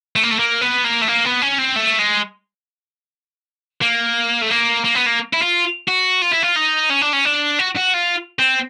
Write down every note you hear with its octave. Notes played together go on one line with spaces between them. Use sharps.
A3
A#3
A3
A#3
B3
A#3
A3
A#3
B3
C#4
C4
A3
G#3
A#3
A3
A#3
A#3
B3
A#3
E4
F4
F#4
F4
E4
F4
D#4
C#4
D4
C#4
D4
F#4
F#4
F4
C4